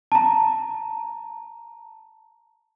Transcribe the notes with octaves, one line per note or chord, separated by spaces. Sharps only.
A5 A#5